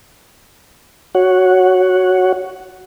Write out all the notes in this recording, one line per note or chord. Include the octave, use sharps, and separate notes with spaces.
F#4 C#5 F#5